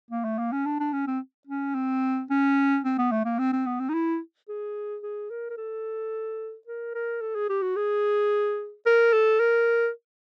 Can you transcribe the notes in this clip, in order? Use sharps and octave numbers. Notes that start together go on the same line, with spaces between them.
A#3
A3
A#3
C#4
D4
D4
C#4
C4
C#4
C4
C#4
C4
B3
A3
A#3
C4
C4
B3
C4
D#4
E4
G#4
G#4
A#4
A#4
A4
A#4
A#4
A4
G#4
G4
F#4
G#4
A#4
A4
A#4